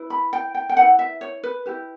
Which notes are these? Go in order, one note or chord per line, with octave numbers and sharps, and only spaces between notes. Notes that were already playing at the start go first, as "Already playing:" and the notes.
Already playing: E4 B4
B5
G5
G5
G5
E4 B4 F#5
E5
C#5
B4
E4 G4 B4